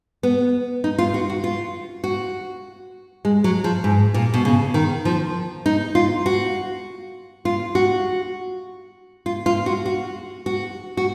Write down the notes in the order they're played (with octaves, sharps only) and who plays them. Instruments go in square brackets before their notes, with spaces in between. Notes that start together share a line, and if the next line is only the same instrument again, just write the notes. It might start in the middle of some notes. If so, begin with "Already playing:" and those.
[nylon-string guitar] B3
D#4
F4
F#4
F#4
F4
F#4
G#3
F#3
F3
G#2
A#2
B2
C#3
D#3
F3
D#4
F4
F#4
F4
F#4
F4
F4
F#4
F#4
F#4
F#4